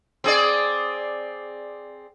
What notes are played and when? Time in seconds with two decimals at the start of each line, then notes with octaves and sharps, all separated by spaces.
0.24 C4 G#4 D5